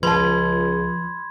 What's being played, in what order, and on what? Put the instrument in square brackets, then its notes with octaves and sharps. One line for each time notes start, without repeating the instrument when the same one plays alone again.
[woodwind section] C#2 [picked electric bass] F3 [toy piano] B4 A5 [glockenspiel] B5 C6 G#6